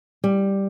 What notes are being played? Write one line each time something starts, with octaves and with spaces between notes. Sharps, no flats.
G3